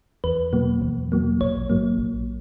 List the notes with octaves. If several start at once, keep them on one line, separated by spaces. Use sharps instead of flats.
E2 B4
B2 F#3 A#3
E2
B2 F#3 A#3
A#1 C#5
G#2 F#3 A#3
A#1